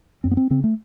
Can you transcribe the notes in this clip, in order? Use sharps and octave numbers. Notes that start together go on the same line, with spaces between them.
F#2 C4
B3
C4
C#3 C4
A3